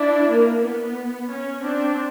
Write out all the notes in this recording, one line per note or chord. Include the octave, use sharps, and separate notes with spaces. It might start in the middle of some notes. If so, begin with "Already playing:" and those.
Already playing: D4 E4
A#3
B3
C#4
C4 D4